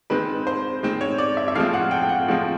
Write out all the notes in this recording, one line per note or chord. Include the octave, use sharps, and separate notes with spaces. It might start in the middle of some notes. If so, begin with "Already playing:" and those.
D#3 G#3 C4 B4
C5
D#3 G#3 C4
C#5
D5
E5
E5
A2 F3 G#3 C4 F5
F#5
G5
G5
F#5
A2 F3 G#3 C4